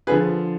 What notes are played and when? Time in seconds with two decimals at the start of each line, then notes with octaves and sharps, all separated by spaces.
0.07 D3 F3 G#4 B4